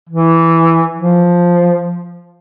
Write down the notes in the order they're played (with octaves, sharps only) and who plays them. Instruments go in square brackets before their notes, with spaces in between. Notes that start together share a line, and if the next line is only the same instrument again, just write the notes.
[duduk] E3
F3